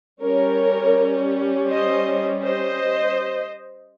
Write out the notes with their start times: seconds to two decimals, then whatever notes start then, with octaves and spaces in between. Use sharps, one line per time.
0.23 G3 C#4 A#4 C#5
1.70 C5 D#5
2.44 C5 D#5